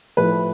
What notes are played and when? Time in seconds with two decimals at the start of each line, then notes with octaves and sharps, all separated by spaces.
0.17 A2 F3 A3 B4